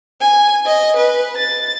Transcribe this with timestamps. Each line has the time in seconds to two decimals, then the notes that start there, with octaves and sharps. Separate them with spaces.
0.20 G#5
0.65 D#5
0.96 B4
1.36 A6